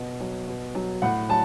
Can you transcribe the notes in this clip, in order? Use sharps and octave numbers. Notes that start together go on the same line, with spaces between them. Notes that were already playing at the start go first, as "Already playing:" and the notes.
Already playing: B2
F#3
B2
F#3
A2 F#5
F#3 A5